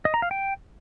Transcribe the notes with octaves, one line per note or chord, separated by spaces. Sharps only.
D#5
A#5
F5
G5